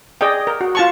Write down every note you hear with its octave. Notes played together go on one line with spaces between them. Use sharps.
G#4 D5 D#5 G5
A#4
F#4
F4 A5 C#6